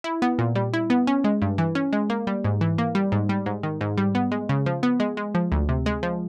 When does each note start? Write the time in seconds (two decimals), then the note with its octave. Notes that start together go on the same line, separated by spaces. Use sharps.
0.04 E4
0.22 B3
0.39 A#2
0.56 G3
0.74 E4
0.90 B3
1.07 C#4
1.24 G#3
1.42 G2
1.58 E3
1.75 C#4
1.93 G#3
2.10 A#3
2.27 G3
2.44 G#2
2.61 E3
2.78 A#3
2.95 G3
3.12 G#2
3.29 G3
3.46 G#2
3.63 D#3
3.81 G#2
3.98 G3
4.15 B3
4.32 G#3
4.49 C#3
4.66 F3
4.83 B3
5.00 G#3
5.17 G#3
5.35 F3
5.52 D2
5.69 C3
5.86 G#3
6.03 F3